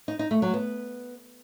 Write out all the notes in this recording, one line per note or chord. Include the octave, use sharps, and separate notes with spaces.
D#4
D#4
A3
F#3
B3